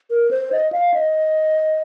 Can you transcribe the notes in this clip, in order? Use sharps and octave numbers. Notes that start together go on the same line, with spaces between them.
A#4
C5
D#5
F5
D#5